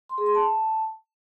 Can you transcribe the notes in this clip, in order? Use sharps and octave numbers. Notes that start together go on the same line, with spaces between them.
C6
G#4
C6
A5